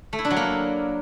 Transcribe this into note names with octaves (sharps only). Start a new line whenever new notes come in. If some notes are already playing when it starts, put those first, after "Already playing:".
A3
E4
D4
F#3
A#3